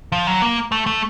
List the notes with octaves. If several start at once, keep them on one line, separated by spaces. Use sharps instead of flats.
F3
F#3
A#3
A3
A3